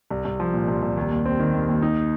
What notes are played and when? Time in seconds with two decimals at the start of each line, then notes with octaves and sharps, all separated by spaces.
0.11 C2
0.25 C2
0.40 F3
0.53 A#2
0.68 C2
0.82 C2
0.97 D#2
1.11 D#2
1.26 C4
1.40 D#3
1.54 D#2
1.68 D#2
1.82 D#4